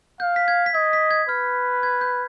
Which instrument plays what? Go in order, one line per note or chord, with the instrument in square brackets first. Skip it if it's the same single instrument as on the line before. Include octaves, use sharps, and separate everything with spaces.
[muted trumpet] F5 [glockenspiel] G6
[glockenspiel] B6
G#6
B6
[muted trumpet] D#5 [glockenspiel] G#6
[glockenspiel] B6
G#6
[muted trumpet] B4 [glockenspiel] F6
[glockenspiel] G#6
G6